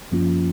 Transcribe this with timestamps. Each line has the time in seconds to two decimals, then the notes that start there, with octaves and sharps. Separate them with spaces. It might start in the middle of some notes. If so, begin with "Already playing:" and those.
0.12 F#2 F3 A#3 C#4 F4